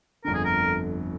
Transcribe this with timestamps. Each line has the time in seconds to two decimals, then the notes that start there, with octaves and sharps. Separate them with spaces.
0.24 G1 F2 D3 A#4
0.34 G#4
0.44 A#4